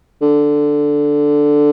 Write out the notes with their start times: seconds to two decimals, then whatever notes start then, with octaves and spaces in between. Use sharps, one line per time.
0.22 D3